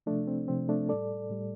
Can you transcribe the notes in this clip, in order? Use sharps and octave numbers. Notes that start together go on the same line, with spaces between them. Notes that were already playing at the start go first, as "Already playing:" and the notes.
C3 F3 A3 D4
C4
C3 F3 C4
A3 D4
A2 G3 A4 D5
A2 G3